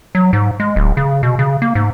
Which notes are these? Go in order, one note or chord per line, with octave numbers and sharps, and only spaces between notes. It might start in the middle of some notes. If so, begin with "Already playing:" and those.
F#3
G#2
G#3
D1
C#3
B2
C#3
A#3
G#2